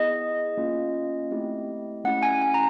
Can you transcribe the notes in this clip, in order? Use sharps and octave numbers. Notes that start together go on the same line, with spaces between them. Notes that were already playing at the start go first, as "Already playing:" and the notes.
Already playing: B3 E4 G#4 D#5
A#3 C#4 F4
A3 C4 E4 G4
A3 C#4 E4 G4 F#5
G#5
G#5
A#5